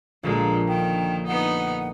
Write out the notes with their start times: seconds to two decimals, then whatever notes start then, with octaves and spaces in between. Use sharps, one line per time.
0.23 A#1 A#2 D3 G#3 A#3
0.68 D#3 G5
1.28 B3 D#4 F#5